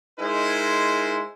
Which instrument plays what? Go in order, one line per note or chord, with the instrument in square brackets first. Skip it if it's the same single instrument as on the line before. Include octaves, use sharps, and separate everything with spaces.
[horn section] G#3 D#4 E4 G#4 A#4 C5